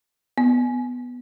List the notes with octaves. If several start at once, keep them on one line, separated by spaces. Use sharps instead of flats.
B3